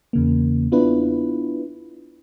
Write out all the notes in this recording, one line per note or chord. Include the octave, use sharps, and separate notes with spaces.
E2 C#3 A#3
B3 D4 E4 F4 B4